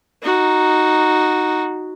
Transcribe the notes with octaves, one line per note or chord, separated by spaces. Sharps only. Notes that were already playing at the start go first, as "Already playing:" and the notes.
D#4 F#4